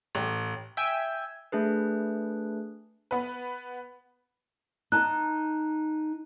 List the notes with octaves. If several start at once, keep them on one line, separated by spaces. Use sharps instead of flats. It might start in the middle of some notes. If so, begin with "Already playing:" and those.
A1
E5 G5 G#5
A3 D4 G#4 B4
B3 B4
D#4 A5 F#6